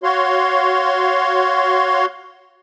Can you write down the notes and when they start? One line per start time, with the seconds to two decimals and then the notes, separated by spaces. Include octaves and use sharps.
0.03 F#4 C#5 F5 C6